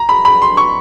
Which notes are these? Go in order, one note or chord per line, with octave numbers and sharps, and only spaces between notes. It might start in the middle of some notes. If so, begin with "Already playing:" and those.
Already playing: A#5
B5
B5
C6
C#6